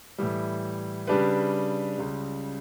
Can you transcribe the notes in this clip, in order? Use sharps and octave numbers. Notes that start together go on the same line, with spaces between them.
A2 E3 G3
C#3 G3 D4 G4 B4
C#2 C#3 G3